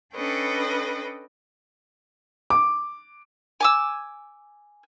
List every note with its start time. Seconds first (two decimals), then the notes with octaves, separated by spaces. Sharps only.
0.15 C#4 D4 A4 B4 D#5 G5
2.50 D6
3.60 G#5 D6 E6